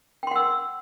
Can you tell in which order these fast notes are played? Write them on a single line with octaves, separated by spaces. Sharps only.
G5 C6 F#5 E6